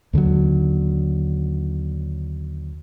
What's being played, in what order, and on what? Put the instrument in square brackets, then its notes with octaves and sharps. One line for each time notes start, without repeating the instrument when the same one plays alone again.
[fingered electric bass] D#2 D3 F3 F#3